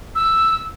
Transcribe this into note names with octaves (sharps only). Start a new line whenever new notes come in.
E6